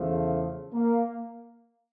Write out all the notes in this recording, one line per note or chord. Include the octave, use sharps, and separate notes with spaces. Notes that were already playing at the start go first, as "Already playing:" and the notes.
Already playing: E2 C#3 F3 A3
A#3